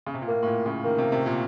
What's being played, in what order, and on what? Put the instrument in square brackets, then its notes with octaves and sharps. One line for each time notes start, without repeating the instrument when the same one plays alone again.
[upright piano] C#3
C3
A#2
[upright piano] A2 [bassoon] A#3
[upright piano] A2
A#2
C#3
[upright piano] D#3 [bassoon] A#3
[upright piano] C3
C3
A#2